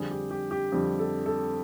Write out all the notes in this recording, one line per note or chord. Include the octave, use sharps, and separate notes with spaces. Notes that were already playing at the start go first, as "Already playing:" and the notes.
Already playing: F2 D3 G3 G#4
G4
G4
G4
F2 D3 G3
A4
A4